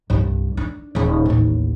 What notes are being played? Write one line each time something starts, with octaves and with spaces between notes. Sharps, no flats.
C2 G2
D4
D#1 C#3
A1 D#2